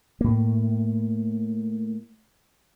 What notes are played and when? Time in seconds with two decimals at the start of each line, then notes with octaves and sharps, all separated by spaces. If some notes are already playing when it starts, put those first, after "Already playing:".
0.21 A2 A#3